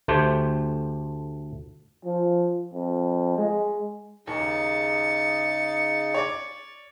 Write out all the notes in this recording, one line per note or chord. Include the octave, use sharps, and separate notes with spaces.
D2 A3 G4 C5 G5
F3
F2
G#3
D#2 C#3 D#4 G#4 A6 C#7
C#5 D5 D6